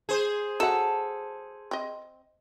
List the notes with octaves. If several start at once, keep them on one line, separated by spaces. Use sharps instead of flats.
G#4 C5
F#3 A4 F#5
C4 D#5